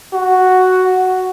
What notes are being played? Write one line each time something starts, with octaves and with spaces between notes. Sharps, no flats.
F#4